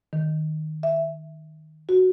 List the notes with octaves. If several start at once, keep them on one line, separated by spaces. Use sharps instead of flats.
D#3
E5
F#4